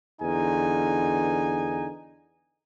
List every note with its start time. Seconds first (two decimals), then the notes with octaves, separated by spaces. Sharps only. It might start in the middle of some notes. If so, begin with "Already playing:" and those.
0.21 E2 D3 D#4 G#5